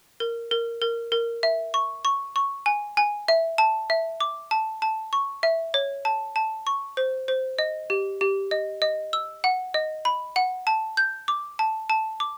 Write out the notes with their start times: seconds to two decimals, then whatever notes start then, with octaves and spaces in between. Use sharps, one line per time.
0.20 A#4
0.51 A#4
0.82 A#4
1.12 A#4
1.43 E5
1.74 C#6
2.05 C#6
2.36 C#6
2.66 G#5
2.97 G#5
3.28 E5
3.58 A5
3.90 E5
4.21 D6
4.51 A5
4.82 A5
5.13 C#6
5.43 E5
5.74 C#5
6.05 A5
6.36 A5
6.67 C#6
6.97 C5
7.28 C5
7.59 D#5
7.90 G4
8.21 G4
8.51 D#5
8.82 D#5
9.13 E6
9.44 F#5
9.74 D#5
10.05 B5
10.36 F#5
10.67 A5
10.97 G6
11.28 D6
11.59 A5
11.90 A5
12.20 D6